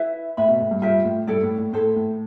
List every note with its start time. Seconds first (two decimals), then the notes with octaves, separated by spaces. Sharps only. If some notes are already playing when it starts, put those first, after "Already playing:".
Already playing: E4 B4 E5
0.37 A2 B4 E5 B5
0.48 B2
0.60 A2
0.71 G2
0.82 G2 F4 C5 E5 G5
1.05 A2
1.27 G2 E4 A4 D5 G5
1.43 A2
1.58 A2
1.73 A2 E4 A4 C5
1.96 A2